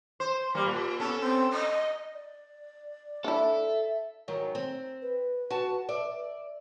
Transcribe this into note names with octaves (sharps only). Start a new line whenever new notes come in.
C5
G3 A#3
A#2
B3 C#4 A4
C4
D#5
D5
D4 E4 A4 E5
G#2 D#3 F#3
C4
B4
F#4 A5
D5 E5